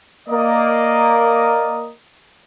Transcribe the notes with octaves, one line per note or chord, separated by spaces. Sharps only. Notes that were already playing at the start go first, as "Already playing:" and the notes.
A#3 A#4 D5 D#5